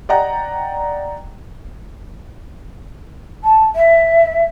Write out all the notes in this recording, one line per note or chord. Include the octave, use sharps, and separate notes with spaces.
D5 D#5 F#5 G5 A#5
A5
E5